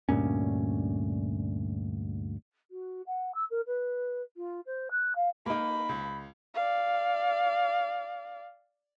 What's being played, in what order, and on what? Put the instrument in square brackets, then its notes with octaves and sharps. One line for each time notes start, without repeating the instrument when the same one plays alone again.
[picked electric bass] D2 G2 A#2 C#4
[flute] F#4
F#5
E6
A#4
B4
F4
C5
F#6
F5
[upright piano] A#3 D#4 [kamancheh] B5
[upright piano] C#2
[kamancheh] D5 F5